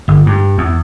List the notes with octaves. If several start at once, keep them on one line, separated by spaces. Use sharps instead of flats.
G1
G2
E2